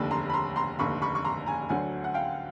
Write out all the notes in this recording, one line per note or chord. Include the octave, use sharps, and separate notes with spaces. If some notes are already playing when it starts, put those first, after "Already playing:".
Already playing: F1 D#2 D3 A5 B5
A#5 C6
B5
A#5 C6
A#5 C6
F1 D#2 D3 B5 C#6
B5 C#6
C#6
A#5 C6
G#5 A#5
D2 D3 F#3 F#5 G#5
F#5
F5 G5